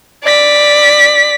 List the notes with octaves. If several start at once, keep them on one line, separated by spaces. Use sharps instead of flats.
D5 B6